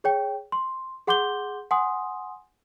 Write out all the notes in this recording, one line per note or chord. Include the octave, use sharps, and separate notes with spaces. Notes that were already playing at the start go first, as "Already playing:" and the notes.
G#4 C#5 G5
C6
G#4 F#5 C6 D6 G6 G7
F#5 G#5 C6 D#6